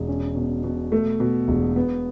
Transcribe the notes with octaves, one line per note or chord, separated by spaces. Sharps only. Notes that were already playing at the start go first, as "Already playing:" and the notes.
Already playing: E1
C#4
B2
B2
A3
B2
E1
B3